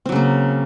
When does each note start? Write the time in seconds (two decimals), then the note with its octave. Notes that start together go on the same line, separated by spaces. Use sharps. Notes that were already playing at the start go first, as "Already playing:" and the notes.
0.06 C4
0.09 F#3
0.12 C#3
0.16 A#3